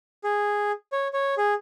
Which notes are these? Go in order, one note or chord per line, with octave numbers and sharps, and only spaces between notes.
G#4
C#5
C#5
G#4